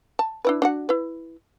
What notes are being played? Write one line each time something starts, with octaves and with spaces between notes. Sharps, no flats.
A5
D4 E4 B4
D4 F#4 F#5
E4 B4